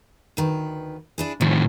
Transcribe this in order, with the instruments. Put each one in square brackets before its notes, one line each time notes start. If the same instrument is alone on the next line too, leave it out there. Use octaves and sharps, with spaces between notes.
[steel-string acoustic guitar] D2 D#3 B4
D4 E4 G#4
[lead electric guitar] A2 D#3 [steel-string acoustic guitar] F3